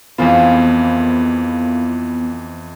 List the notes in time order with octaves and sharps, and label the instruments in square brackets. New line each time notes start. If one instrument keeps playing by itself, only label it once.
[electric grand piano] F2 E3 F4 [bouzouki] F3 A#3 G#4 [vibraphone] B3